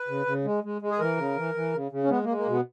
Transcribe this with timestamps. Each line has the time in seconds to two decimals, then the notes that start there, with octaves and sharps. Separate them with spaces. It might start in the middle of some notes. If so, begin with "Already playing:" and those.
Already playing: B4
0.08 C#3
0.26 C#3
0.45 G#3
0.64 G#3
0.82 G#3
0.91 G#4
0.99 E3 A#4
1.18 C#3
1.37 E3
1.55 E3
1.74 C#3
1.91 C#3
2.03 C#4
2.10 G#3 B3
2.24 A#3
2.29 G#3
2.37 A#3
2.47 B2 B3